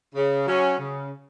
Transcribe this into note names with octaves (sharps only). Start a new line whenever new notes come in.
C#3
F#3 C#4
C#3